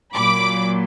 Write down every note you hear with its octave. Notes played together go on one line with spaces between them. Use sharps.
A#2 F#3 B5 D6